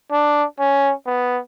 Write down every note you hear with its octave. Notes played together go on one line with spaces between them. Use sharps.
D4
C#4
B3